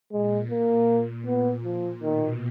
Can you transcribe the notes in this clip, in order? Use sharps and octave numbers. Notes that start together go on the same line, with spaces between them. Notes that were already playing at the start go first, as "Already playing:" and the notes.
A#2 G#3
A#2 A#3
B3
F3
B2 D#3